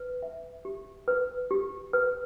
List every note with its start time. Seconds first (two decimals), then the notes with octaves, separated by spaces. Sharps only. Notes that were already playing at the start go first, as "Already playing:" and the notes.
Already playing: B4
0.23 E5
0.65 G4
1.08 B4
1.51 G4
1.93 B4